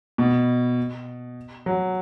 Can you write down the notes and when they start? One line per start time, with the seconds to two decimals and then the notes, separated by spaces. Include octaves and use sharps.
0.18 B2
1.66 F#3